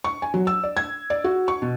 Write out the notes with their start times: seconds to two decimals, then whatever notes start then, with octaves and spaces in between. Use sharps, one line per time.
0.04 C#6
0.22 G#5
0.34 F#3
0.47 E6
0.63 D5
0.77 G#6
1.10 D5
1.24 F#4
1.48 C#6
1.62 B2